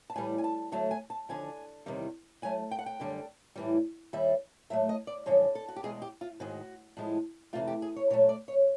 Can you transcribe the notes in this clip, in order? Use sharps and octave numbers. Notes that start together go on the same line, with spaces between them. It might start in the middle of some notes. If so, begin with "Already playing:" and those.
A5
A2 E3 G3 G#5
G#5
A5
D2 D3 F#3 A3 A5
G#5
A5
D#2 D3 F3 G#5
E2 C3 D#3 G3
A2 F#3 A3 G#5
G5
F#5
G5
F#2 D3 G3
A2 E3 G3
D#2 D#3 G3 E5
A2 F#3 A3 E5
D#5
D5
F#2 D3 F3 G#3 C#5
A4
F#4
G4
E2 B2 G#3 G#4
G4
F4
G#2 D#3 G#3 F#4
A2 F3 G#3
F2 C3 E3 A3 F4
G4
G#4
C#5
A#2 F#3 A3 C#5
D5
C#5